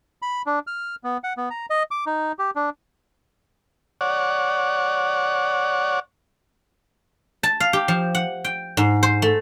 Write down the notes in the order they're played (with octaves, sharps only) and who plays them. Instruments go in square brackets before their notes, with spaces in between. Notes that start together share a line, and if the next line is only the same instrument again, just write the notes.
[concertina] B5
D4
F6
B3
F#5
B3
A#5
D#5
D6
D#4
G4
D4
[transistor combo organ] C#5 D5 F#5
[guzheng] A5
F5
G4
F3
F#5
G5
G#2
C5
A3